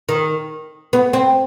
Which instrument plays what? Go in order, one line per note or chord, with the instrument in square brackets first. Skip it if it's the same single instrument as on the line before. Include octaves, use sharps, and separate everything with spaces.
[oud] D#3
B3
C4